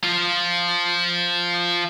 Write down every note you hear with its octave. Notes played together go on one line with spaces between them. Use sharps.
F3 F4